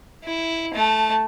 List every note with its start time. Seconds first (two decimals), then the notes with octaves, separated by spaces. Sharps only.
0.24 E4
0.74 A3 A5